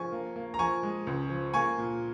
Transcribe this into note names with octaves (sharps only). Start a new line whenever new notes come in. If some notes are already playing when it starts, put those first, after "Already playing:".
Already playing: F3 G#5 C#6
A#3
A#3
A#5
F3 G#5 C#6
G#3
C#2
F3
A#3 G#5 C#6
A#2